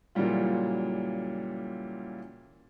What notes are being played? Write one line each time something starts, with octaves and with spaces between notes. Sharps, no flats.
A#2 C#3 E3 F#3 G3 F4